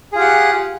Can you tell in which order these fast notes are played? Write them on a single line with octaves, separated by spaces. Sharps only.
G#4 F4 G4 F#5